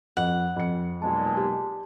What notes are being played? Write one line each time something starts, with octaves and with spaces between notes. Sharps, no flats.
F2 F#5
F2 C#7
B1 A#2 G#3 A5
G4